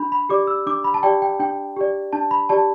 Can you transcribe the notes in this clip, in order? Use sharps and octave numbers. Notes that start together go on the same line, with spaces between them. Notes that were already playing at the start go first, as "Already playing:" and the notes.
Already playing: D4 B5
B5
G4 D5 D6
E6
D4 D6
B5
A5
G4 D5 G5
G5
D4 G5
G4 D5
D4 A5
B5
G4 D5 A5